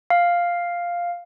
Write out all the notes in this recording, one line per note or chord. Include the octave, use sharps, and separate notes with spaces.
F5